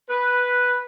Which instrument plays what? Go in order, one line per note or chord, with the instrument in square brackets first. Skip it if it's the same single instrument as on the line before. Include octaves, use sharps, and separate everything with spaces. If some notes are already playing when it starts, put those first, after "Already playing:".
[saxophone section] B4